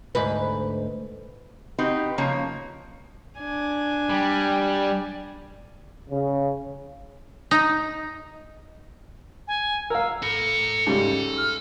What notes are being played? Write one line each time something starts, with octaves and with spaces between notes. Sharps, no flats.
D2 G#2 B4
C4 D#4 F#4 G4 B4
C#3 F3 A#3 C#5
D4 G#5
G3
C#3
D#4
G#5
A#4 F5 E6
A4 B5 C#7
G#2 C#3 G3
F6